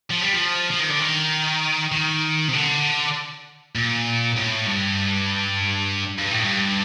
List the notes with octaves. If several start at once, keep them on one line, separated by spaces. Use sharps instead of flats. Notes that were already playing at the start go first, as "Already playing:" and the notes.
F3
G3
F3
F3
D#3
D3
D#3
D#3
C3
D3
A#2
A2
G2
G2
A2
G2